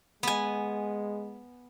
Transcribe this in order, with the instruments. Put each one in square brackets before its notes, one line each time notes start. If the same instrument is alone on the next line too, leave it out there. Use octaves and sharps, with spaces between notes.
[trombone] G#3 [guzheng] B3 G#5